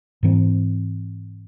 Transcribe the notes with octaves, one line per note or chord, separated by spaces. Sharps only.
G#2 E3 C4